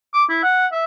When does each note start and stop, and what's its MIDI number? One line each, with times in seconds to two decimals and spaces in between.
0.14 0.24 86
0.29 0.43 64
0.43 0.67 78
0.72 0.84 76